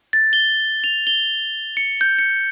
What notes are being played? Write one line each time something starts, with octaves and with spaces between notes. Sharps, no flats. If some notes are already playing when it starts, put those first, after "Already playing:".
A6
G7
F7
G7
C#7
G6
C#7